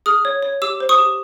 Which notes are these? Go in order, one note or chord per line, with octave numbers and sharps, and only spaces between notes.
G#4 D#6 F6
C#5
C#5
G4 D6 E6
C5
C#6 D#6
G4